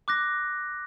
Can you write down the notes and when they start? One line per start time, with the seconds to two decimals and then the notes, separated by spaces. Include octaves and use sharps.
0.08 D6 F#6 A#6